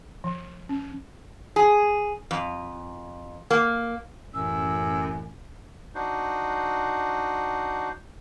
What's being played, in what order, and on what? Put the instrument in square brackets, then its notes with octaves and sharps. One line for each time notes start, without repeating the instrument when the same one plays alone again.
[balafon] F3
C#4
[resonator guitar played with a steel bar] G#4
F2
A#3
[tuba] A1 [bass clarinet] F#2 [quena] E6
[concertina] D4 D#4 F#4 C5